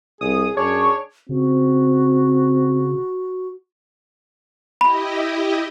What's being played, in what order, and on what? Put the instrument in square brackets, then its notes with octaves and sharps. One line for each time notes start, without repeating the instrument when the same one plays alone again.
[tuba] C2 [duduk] G#4 [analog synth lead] D#6
[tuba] F#2 [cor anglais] D4 [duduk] G#4 [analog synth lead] C#5
[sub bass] C#3 [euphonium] C4 [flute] F#4
[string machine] E4 G4 D#5 [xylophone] B5